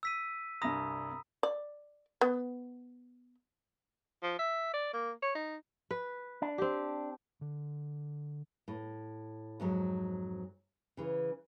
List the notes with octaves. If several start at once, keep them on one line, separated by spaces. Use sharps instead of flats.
E6 B6 D#7
C2 G2 A#5 B5 D#6 A#6
D5
B3
F3
E5
D5
A#3
C#5
D#4
B4
D4
C4 G4
D3
A2
F2 G#2 F#3
C#3 E3